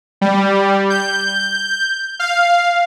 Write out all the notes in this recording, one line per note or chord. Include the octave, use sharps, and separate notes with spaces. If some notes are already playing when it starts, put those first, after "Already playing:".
G3
G6
F5